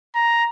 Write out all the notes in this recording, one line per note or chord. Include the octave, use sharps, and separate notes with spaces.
A#5